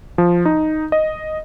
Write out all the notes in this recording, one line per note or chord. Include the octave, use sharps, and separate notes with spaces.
F3
D#4
D#5